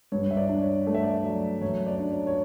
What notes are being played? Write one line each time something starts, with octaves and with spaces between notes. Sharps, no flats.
G2 C#5
E5
D5
D4
C#5
A3 D5
E5
D5
F#3
F#2 C#5
D5
D4
C#5
C#5